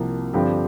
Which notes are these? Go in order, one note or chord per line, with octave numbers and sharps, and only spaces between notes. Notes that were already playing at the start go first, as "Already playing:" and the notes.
Already playing: C2 C3 F3 A#3
G2 D3 F3 C4 G4